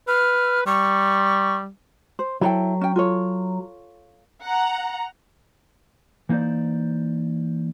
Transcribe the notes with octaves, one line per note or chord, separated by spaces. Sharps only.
B4 F6
G3 C#6
C5
F#3 E4 A4 G5
C#4 G5
F4 A4 C#5
F#5 A#5
E3 A#3 D#4 C5 D5